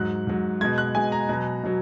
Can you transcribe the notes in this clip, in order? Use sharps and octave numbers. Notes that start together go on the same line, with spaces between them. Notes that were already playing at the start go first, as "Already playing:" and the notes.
Already playing: G#2 F#3 F#6
G#2 F#3
B2 G#3 G#6
F#6
B2 G#3 G#5
A#5
B2 F#3
B2 F#3